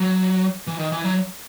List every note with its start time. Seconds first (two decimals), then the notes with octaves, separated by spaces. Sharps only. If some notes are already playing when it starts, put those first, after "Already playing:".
Already playing: F#3
0.67 E3
0.79 D#3
0.92 E3
1.04 F#3